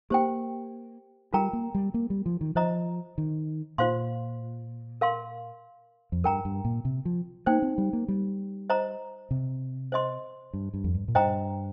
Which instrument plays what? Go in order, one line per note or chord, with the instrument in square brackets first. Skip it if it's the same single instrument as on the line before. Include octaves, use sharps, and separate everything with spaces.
[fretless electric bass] A#3 [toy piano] G4 C5 G5
[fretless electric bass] G3 [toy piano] F4 A#4 G5 A#5
[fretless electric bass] A#3
G3
A#3
G3
F3
D#3
[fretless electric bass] F3 [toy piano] C5 D#5 A#5
[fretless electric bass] D#3
[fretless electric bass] A#2 [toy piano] F4 C5 F5 C6
[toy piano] A#4 F5 C6
[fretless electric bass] F2
[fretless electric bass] G2 [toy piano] A#4 G5 A#5
[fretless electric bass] G2
A#2
C3
F3
[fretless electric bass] A#3 [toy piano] D#4 C5 G5
[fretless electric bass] C4
G3
A#3
G3
[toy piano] C5 D#5 A#5
[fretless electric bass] C3
[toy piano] C5 D#5 C6
[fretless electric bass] G2
G2
F2
G2
A#2
[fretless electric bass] G2 [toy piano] C5 D#5 G5 A#5